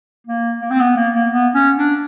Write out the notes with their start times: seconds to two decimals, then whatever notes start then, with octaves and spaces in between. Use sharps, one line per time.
0.27 A#3
0.62 A#3
0.70 C4
0.80 B3
0.96 A#3
1.14 A#3
1.32 B3
1.55 C#4
1.78 D4